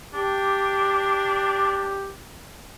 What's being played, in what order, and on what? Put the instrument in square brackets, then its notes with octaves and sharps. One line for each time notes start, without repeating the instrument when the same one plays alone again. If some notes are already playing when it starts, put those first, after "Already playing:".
[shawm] D4 [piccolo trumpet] G4